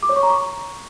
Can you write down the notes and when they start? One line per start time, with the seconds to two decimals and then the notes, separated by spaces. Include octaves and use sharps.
0.03 D6
0.09 C#5
0.16 C#6
0.23 A#5
0.30 C#6